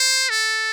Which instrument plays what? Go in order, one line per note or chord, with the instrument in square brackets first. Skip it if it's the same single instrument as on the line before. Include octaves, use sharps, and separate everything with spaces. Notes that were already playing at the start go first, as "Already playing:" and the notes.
Already playing: [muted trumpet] C5
A4